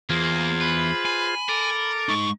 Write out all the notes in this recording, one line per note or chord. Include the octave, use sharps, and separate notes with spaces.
E2 A#3 F4 G#4 C5
B4 B5
G#5
A4 A#4 D6
G#3 D#4 C#6